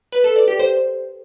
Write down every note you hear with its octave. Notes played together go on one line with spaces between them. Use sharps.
B4
A4
D5
G4
C5